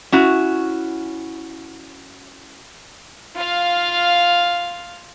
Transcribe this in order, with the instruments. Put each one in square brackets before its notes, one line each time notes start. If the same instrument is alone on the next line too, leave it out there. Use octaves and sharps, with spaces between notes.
[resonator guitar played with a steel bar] C#4 E4 F#4
[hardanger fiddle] F4 F5